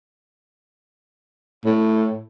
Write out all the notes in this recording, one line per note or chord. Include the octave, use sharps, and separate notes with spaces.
A2